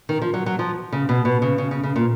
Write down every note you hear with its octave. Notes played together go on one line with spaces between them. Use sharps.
D#3
F3
F#3
F#3
F3
C#3
B2
B2
C#3
C#3
C#3
C#3
A#2